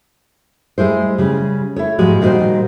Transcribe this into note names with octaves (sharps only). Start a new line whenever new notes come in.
G3 G#3 E4 C5
C#3 G3
E4 A4 C#5
G#2 F3 G3 G#3 F#4
A#2 D#3 G3 F4 F#4 C5